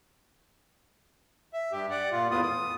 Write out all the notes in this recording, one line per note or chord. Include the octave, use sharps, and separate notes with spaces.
E5
G2 G4
D5 F#5
A#2 F4
E2 A2 B3 F4 D#6
D#6